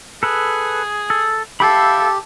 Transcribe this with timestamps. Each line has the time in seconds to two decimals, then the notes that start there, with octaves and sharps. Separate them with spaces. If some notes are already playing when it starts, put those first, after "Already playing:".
0.23 G#4 A4 B4
1.10 A4
1.60 G4 A4 E5 F5 G5 B5